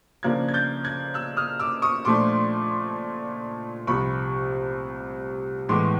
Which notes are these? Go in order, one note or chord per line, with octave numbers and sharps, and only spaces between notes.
C#3 F3 A#3 D4 F#6 G#6
G#6
G6 A6
F#6 G#6
E6 F#6
D#6 F6
D6 E6
C#6 D#6
A#2 F3 A3 D4 C6 D6
C2 C3 F3 B5 C#6
A2 E3 G#3 B3 C6 D6